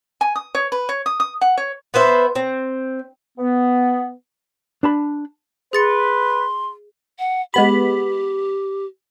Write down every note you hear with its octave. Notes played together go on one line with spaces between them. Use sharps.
G#5
D#6
C#5
B4
C#5
D#6
D#6
F#5
C#5
B3 B4 C5 E5
C4
B3
D4 A5 B5
G#4 B4 C6 A6 C#7
F#5
G#3 B3 G4 B5